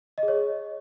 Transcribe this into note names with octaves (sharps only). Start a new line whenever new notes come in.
D#5
G#4
C#5